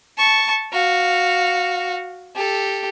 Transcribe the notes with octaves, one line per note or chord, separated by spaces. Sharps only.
A5 C#6
F#4 F5
G4 A4